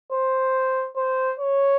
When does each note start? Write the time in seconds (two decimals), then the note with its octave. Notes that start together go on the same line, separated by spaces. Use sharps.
0.12 C5
0.96 C5
1.39 C#5